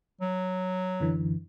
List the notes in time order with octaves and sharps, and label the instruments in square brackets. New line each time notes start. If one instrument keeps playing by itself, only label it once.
[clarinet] F#3
[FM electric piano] F#2 D3 E3